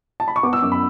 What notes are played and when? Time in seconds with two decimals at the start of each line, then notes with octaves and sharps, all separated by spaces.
0.20 A5
0.28 B5
0.36 C#6
0.43 B3 D6
0.53 E6
0.62 F#2 D6
0.72 B5